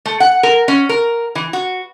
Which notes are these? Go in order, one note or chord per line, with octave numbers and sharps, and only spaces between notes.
A3
F#5
A#4
C#4
A#4
E3
F#4